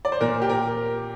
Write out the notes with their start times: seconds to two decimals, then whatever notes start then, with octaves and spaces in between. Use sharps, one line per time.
0.05 D5
0.12 C5
0.21 A#2 A#4
0.42 G4
0.49 A#4